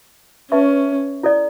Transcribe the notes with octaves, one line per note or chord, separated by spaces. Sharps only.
C#4 B4 E5 A5 C#6
E4 A4 D5